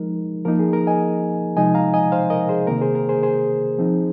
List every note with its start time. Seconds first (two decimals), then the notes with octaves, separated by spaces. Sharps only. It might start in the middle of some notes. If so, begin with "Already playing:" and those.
Already playing: F3 G#3 D#4 A#4
0.45 F3 A#3 D#4 A#4
0.59 G#4
0.73 A#4
0.87 D#5 G#5
1.56 C3 F3 G#3 D#4 D#5 G#5
1.74 F5 A#5
1.94 D#5 G#5
2.12 C5 F5
2.30 A#4 D#5
2.49 G#4 C5
2.67 C3 D#3 A#3 A#4
2.82 G#4 C5
2.95 A#4
3.09 G#4 C5
3.23 G#4 C5
3.79 F3 C4 D#4